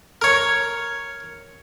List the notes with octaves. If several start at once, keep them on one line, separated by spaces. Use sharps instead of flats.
A#4 C#5